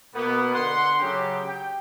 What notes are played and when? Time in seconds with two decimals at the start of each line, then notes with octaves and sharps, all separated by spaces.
0.15 B2 A#3 B3
0.54 D3 F#5 C6
1.00 C#3 F#3 G4
1.47 G5